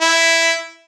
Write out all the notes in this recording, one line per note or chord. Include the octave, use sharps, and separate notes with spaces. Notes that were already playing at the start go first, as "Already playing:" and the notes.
E4